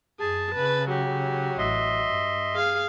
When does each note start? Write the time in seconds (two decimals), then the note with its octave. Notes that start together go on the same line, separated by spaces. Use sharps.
0.20 F#2 G#4 A5
0.55 C#3 B4
0.89 F#3 G4
1.58 A1 D#5 E5 C6
2.09 G2
2.54 G#4 F5